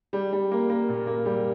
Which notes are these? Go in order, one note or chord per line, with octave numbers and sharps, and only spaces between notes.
G3
G3
A#3
A#3
A#2
A#3
G3